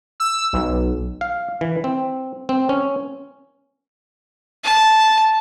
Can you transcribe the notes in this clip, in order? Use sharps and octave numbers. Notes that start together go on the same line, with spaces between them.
E6
B1
F5
E3
C4
C4
C#4
A5